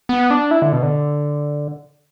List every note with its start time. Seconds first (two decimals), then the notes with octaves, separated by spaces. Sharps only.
0.09 B3
0.30 D4
0.51 E4
0.62 D3
0.72 B2
0.83 D3